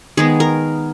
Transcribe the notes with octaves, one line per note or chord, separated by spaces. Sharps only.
D#3 G#3 B3 G#4
A#4